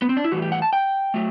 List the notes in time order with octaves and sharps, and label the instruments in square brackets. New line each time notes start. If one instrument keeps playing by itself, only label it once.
[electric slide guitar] B3
C4
D4
E4
A2 E3 G3 F#4
G4
F#5
A5
G5
F#3 A3